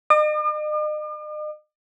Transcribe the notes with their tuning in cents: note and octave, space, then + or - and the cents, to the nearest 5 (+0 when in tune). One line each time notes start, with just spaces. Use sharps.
D#5 -40 D6 +45